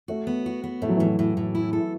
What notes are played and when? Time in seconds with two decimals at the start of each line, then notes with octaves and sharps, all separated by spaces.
0.08 A3 F#4
0.27 B3
0.46 F#4
0.64 B3
0.82 A2 A3
0.89 F#3
0.96 E3
1.00 A2 F#3
1.19 A2
1.37 A2
1.55 E4
1.73 A4